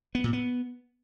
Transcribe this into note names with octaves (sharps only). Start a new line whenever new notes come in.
B3
A#2
B3